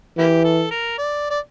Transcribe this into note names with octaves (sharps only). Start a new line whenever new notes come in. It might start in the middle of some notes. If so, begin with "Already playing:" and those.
E3 A#3 E4 G4
A4
A#4
D5
D5